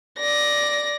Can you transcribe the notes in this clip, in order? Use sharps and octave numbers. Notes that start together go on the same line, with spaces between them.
D5 A#6